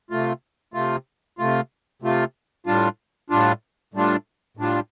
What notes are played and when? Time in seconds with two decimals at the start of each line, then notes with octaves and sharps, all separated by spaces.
0.10 C3 A3 F4
0.74 C3 A3 F4
1.38 C3 A3 F4
2.02 C3 A3 F4
2.66 A2 G3 D4 F4
3.30 A2 G3 D4 F4
3.94 A2 G3 D4 F4
4.57 A2 G3 D4 F4